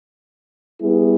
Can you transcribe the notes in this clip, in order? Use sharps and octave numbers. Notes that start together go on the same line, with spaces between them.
G3 B3 E4 G#4